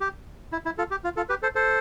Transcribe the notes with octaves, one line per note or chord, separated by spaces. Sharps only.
G4
E4
E4
F4 A4
G4
F4
F4 A4
G4 B4
A4 C5
A4 C5